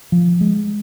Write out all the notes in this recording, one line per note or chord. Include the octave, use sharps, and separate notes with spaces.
F3
G#3